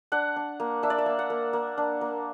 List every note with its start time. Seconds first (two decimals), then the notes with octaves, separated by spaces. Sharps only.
0.12 D4 F#5
0.36 D4
0.60 A#3
0.83 D4 E5
0.90 D5
0.98 E5
1.06 A#3
1.19 F#5
1.30 A#3
1.53 A#3
1.78 D4
2.01 A#3